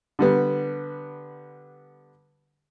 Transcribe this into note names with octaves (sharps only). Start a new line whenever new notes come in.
D3 G3 B3